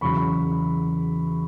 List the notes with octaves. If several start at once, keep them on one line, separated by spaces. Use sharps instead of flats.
E2 C#3 F#3 B5 C#6